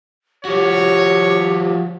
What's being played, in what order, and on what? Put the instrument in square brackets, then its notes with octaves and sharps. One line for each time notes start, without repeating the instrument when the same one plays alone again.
[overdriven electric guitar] F3 F#4 [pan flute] G4 [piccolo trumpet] C#5